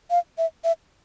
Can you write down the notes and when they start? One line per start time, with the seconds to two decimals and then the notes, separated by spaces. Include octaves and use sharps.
0.11 F5
0.38 E5
0.64 E5